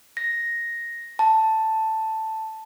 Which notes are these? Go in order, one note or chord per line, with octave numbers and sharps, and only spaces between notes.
A#6
A5